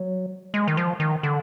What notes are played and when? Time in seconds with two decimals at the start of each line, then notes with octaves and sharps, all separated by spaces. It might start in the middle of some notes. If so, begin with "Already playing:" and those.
Already playing: F#3
0.54 G#3
0.68 D#3
0.77 F3
1.00 D#3
1.23 D3